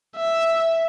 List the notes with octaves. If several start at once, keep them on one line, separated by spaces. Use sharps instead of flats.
E5